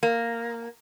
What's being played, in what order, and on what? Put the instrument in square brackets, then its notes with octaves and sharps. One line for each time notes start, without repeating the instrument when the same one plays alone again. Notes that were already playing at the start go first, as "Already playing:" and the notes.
[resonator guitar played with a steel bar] A#3